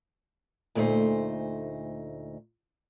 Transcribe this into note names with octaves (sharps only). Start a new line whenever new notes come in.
D2 A#2 A3 D#4 C5